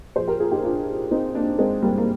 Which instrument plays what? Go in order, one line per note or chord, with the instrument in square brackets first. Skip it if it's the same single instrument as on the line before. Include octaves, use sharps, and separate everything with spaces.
[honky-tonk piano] A#2 F3 G#4 C5
G4 A#4
F4 G#4
D#4 G4
D4 F4
C4 D#4
A#3 D4
G#3 C4
G3 A#3
A#3